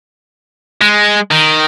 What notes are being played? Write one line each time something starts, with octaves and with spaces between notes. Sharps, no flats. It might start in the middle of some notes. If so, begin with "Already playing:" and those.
G#3
D#3